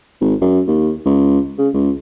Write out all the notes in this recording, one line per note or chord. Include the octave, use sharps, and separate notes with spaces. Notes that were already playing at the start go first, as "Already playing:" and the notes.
G#1
F#2
D#2
C#2
C#3
C#2